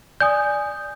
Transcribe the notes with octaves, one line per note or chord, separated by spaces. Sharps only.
D5 G#5 D#6 G6